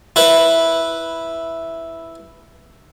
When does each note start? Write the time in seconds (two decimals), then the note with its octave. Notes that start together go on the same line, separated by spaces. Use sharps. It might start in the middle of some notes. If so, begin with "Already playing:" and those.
0.16 E4 B4